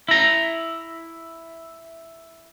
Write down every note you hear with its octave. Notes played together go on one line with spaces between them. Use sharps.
E4 A#5